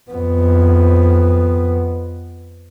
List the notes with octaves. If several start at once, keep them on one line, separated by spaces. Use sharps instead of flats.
F2 B3